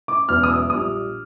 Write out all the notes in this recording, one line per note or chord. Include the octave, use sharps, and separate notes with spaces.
D6
E1 E2 B2 F#3 F6
D#6
E6
A#1 A#2 G3 D#6